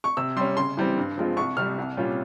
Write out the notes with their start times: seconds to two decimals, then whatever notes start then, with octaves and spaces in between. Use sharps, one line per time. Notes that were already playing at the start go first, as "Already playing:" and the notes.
0.04 C#6
0.17 C3 E6
0.36 G3 C#4 C6
0.57 C#3 C6
0.77 E3 G3 C4
0.98 G2
1.18 F3 G#3 C4 F4
1.37 C2 C#6
1.57 C3 G3 F6
1.78 C2
1.97 A#2 G3 C#4 F4